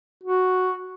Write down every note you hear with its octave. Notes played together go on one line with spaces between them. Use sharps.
F#4